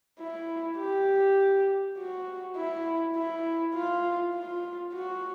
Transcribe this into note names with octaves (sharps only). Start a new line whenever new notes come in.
E4
G4
F#4
E4
E4
F4
F4
F#4